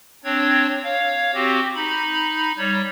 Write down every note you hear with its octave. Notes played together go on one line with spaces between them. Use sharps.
C4 D4 C#5 G#6
C#5 F5
C4 F#4 G4
D#4 B5
G3 C#5